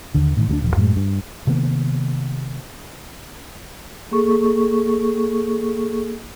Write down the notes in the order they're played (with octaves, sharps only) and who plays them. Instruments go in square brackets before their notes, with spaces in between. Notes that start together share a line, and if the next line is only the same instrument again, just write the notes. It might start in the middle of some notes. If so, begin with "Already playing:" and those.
[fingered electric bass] D#2 D3
A2 D3 D#3
D2 F#3 D4
D#1 F3
F#2 A2 F#3 G#3
G2
C3 D#3 A#3 B3
[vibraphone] A#3 G#4 A4 C#6